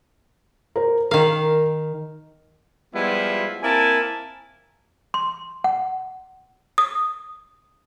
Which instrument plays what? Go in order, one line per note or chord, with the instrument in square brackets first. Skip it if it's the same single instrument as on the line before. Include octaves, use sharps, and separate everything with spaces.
[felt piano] A#4 C5
[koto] D#3 F5 [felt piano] A#4
[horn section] F3 G3 G#3 B3 E4 F4
A#3 C4 E4 A#4 G#5 A5
[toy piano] C6
F#5
[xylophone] D#6